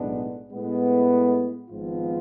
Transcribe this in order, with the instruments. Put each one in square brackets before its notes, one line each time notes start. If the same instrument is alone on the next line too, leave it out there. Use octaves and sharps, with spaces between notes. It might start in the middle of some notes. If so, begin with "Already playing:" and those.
Already playing: [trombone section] B1 A2 G#3 B3 D4
A2 G#3 B3
G#1 G#2 F3 B3 F4